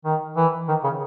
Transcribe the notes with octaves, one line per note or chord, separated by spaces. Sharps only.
D#3
E3
D#3
C#3